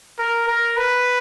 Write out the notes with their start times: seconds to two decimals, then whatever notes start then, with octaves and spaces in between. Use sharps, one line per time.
0.19 A#4
0.48 A#4
0.77 B4